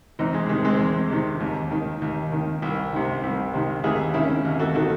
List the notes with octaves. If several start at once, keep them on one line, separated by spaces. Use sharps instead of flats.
E2 C4 D#4
G#3
C3 D#3 G#3
G#3 C4
E2
C3 D#3
D#2
D#3
D#2
D#3
C2
C3 D#3
C2
C3 D#3
D#2 E4 G#4
D#3 C#4 E4
D#2
F#4 A4
D#3 F#4 A4